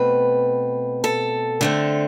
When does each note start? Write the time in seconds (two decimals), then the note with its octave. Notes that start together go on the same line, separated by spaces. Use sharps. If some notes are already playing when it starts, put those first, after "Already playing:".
Already playing: B2 A3 C4 B4
1.04 A4
1.61 D3 A3 C4